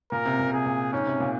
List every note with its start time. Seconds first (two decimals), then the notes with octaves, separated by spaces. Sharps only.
0.12 A#2 A#4
0.25 C3
0.39 A#2
0.53 C3 G#4
0.66 A#2
0.93 G#2 C#4
1.06 C3
1.20 A#2